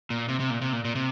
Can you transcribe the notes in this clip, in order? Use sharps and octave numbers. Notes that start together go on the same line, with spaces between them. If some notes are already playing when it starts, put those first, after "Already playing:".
A#2
C3
C3
A#2
C3
A#2
A#2
C3